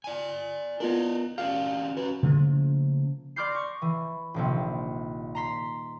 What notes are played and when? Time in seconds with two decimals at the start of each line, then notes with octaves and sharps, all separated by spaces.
0.04 D5 G#5
0.80 B3 D4 F4 A#4 D#5
1.38 C#4 D4 G4 F5
1.97 C#4 F#4 B4
2.23 C#3 F3 A3 A#3
3.36 D5 C6 D6 F6 G6 C7
3.50 C#6 A#6
3.82 E3
4.34 D#1 A#1 C3
5.35 A#5 C6 B6